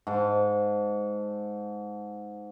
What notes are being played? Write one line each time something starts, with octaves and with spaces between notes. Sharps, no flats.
G#2 A5